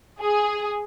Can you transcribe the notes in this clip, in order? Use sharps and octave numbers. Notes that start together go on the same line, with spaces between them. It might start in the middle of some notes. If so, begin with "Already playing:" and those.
G#4